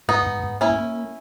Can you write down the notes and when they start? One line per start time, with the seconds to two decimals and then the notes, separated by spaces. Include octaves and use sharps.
0.08 G#2 B3 D#4
0.26 G#2
0.44 G#2
0.61 A#3 C#4 E4
0.79 A#3